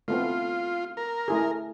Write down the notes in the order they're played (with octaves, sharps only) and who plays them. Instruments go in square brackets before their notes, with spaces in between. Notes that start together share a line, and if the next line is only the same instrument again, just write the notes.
[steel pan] A3 B3 C4 [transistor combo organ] F4
[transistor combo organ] A#4
[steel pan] A3 E4 G#4